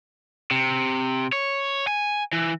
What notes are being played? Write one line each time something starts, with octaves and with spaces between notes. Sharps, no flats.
C3
C#5
G#5
E3